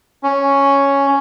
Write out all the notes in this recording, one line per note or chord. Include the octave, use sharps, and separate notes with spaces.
C#4